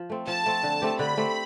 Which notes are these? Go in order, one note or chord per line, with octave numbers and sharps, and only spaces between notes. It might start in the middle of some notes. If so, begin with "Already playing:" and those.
Already playing: F3
A3 C4
F3 A5
A3 C4
D3
A3 C4 G4
D3 B5
A3 C4 G4